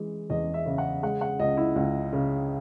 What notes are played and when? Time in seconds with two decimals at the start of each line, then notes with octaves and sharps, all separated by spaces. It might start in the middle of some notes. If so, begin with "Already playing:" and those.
Already playing: E3 G#3
0.30 E2 D#5
0.54 E5
0.66 C#3
0.78 F#5
1.03 G#3 F#5
1.21 F#5
1.39 C#2 D#5
1.57 E4
1.76 C#2
2.13 C#3